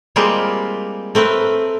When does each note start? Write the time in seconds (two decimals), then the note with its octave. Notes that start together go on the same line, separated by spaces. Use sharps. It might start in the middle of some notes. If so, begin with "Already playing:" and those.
0.16 G3 G#3 A#3 C4 F4 G4
1.15 A3 C4 A#4 B4